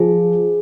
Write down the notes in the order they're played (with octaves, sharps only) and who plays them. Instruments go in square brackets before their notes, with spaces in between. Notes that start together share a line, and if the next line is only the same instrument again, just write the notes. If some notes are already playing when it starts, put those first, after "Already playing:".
Already playing: [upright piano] F3 [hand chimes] G#4